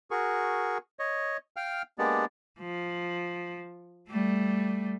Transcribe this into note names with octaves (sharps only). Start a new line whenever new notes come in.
F#4 G#4 A#4 C#6
C#5 D#5
F5 G5 F6
G#3 A#3 B3 D4 G4 D5
F3
G3 A3